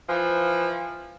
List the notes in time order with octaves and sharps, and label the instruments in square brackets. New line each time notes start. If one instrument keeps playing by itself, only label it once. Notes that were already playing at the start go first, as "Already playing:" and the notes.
[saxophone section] E3 F3